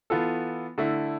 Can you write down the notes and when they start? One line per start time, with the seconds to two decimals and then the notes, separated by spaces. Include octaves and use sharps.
0.10 E3 B3 F4 A4
0.78 D3 A3 E4